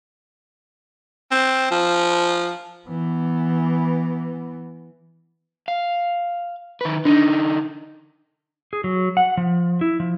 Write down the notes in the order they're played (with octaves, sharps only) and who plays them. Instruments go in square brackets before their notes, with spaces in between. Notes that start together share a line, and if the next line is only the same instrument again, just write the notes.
[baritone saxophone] C4
F3
[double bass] E3 B3
[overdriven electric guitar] F5
D#3 B4
[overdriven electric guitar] D3 D#4 [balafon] D4
[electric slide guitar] G#4
F#3
F#5
F3
E4
F3